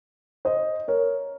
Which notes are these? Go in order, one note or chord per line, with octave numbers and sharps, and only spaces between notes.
C5 D#5
A#4 C#5